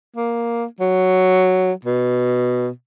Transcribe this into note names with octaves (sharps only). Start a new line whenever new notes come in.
A#3
F#3
B2